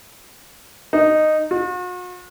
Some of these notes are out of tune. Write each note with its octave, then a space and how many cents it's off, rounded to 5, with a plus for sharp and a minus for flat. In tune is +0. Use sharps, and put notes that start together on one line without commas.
D#4 -10
F#4 -45